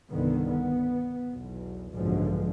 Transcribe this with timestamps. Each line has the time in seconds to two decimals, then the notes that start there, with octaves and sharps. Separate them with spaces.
0.10 C2 G2 D3 D#3 B3
0.49 B3
1.30 B1 E2
1.94 F#1 B1 G#2 D3 F3 G#3